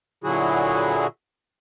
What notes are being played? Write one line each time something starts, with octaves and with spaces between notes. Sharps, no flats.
A#2 D3 F#3 E4 F#4 G#4